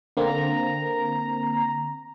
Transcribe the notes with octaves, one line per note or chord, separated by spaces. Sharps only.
D3 A#3 C4 A#5